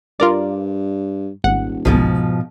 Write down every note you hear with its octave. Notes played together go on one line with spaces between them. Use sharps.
G2 F4 A#4 D5
D#1 G#1 F#5
G1 C2 G#2 B2 F3